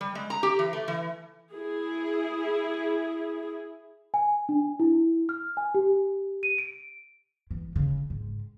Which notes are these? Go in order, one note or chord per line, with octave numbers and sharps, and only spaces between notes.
G3
G#3
A#5
G4
E3
A3
E3
E4 G#4
G#5
D4
E4
F6
G#5
G4
D#7
D7
E3
C#3
G#2